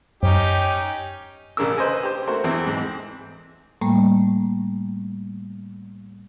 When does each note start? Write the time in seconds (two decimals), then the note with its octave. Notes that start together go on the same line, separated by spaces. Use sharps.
0.23 F#2 C#4 D#4 G4
1.57 A1 C#3 A#4 E6
1.77 B4 C5 D#5 G#5
2.03 G4 C5
2.28 A3 F#4 A#4 C5
2.44 E2 E3 C4 E4
2.67 G#2 C4
3.81 A2 G3 A3 A#3